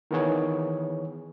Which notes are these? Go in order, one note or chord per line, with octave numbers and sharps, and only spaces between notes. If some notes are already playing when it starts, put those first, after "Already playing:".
D#3 E3 B3 G#4 C#5